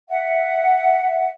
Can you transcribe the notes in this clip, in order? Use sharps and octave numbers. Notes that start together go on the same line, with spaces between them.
E5 F#5